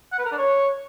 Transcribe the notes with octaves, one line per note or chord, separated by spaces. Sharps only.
F#5
B4
A#4
D4
C#5